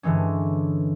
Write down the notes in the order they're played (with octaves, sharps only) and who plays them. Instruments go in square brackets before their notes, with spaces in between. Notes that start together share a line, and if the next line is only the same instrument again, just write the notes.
[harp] G2 D3 E3 G#3 C#4